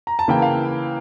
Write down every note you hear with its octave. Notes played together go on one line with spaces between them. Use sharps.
A#5
A5
C#3 E3 A#3 E4 G5
F5